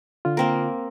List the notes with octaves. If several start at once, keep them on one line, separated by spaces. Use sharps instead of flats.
D3 F4
A#3 C4 A#4